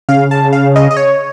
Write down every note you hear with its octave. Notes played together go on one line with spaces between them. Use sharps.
C#3 F5
A5
F5
D#5
D#5
C#5